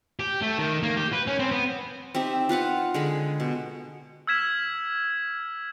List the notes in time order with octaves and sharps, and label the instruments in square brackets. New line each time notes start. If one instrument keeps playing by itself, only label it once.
[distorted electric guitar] G4
A3
D#3
A#3
G4
B4
C#4
C4
B3
[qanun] C4 D#4 G4 E5
F4 B4 F5 F#5
D3 G#3 G#4 B5
B2
[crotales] E6 F6 G#6 B6 E7